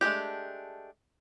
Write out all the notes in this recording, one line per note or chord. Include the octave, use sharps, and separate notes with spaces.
G#3 A3 D4 G4